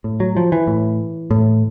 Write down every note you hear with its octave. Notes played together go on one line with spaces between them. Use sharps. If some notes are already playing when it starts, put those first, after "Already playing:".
A2
F#3
F3
E3
A2
A2